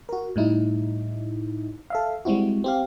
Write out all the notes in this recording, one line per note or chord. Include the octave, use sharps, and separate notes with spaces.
F#4 A#4
A2 G3 D#4 E4
A4 E5 F5
G3 G#3 C4 E4 F#4
C4 G4 F5